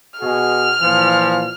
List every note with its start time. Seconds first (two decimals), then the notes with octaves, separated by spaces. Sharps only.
0.20 B2 F#4 G#4 F6
0.81 A#2 E3 F3